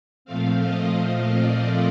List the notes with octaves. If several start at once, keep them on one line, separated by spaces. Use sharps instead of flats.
A#2 F3 A3 C4 F5
D#5
D#5
D5